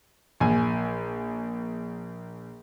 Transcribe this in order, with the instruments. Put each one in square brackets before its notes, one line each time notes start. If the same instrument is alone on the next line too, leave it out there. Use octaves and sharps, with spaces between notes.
[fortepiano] A#1 G#5